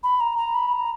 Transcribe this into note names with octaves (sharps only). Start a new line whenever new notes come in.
B5
A#5
A#5
B5
A#5